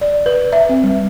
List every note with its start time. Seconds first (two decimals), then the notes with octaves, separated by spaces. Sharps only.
0.01 D5
0.26 B4
0.53 E5
0.69 C4
0.83 G3